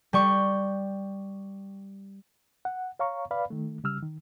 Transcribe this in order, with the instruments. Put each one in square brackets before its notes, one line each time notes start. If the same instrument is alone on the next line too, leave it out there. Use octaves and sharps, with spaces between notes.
[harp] G3 G5 C#6
[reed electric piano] F#5
C#5 F5 A#5 C#6
B4 D5 F5 B5
D#3 A3
C#3 G3 E6 F6
D#3